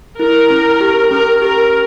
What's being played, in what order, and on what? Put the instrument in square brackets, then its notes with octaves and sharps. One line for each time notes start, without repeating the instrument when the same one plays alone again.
[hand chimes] E4 [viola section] A#4
[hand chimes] C#4
G4
[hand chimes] C#4 [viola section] A#4
[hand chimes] G4 [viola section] A#4